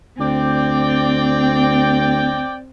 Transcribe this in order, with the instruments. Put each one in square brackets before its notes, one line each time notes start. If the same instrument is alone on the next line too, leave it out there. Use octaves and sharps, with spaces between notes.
[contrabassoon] D2 [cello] C4 [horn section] D5 G5